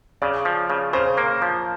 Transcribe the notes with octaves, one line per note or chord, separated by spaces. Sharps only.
C#3 D5
F3
C#3
C#3 C5
A#3
F3